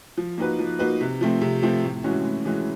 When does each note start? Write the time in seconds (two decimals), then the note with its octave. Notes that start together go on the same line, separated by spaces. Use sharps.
0.17 F3
0.38 A#3 D#4 F#4 B4
0.59 F3
0.79 A#3 D#4 F#4 B4
1.01 C3
1.21 F3 A3 C4
1.41 C3
1.62 F3 A3 C4
1.84 A2
2.04 E3 G#3 C#4 F#4
2.25 A2
2.45 E3 G#3 C#4 F#4